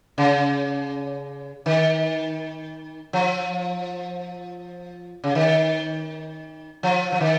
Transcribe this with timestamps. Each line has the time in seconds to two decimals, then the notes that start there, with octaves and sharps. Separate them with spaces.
0.18 C#3
1.66 D#3
3.13 F3
5.24 C#3
5.35 D#3
6.83 F3
7.12 F3
7.20 D#3